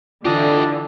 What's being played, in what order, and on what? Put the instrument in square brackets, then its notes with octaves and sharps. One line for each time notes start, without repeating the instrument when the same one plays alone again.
[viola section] D3 E3 [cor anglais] D4 [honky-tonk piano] F4 [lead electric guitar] G4 D#5